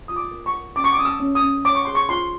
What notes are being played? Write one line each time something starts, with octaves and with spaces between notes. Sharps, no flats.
F4 D#6
D6
A#4
C#6
A#4
C#4 D6
C#6
D6
C#4 D#6
E6
C#4
D#6
C#4
C#5 D6
C#6
G#4 C6
C#6
F4 C6